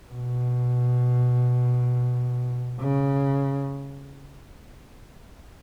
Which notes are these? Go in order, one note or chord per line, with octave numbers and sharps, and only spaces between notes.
B2
C#3